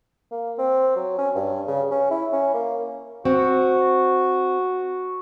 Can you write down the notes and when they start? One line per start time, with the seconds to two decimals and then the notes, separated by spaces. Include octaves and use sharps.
0.31 A#3
0.58 C4
0.96 F#3
1.18 C#4
1.35 G2
1.68 C#3
1.91 C#4
2.11 E4
2.33 C#4
2.54 A#3
3.25 C4 F#4